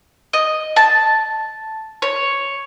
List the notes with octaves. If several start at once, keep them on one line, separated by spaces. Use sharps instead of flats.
D#5
A5
C#5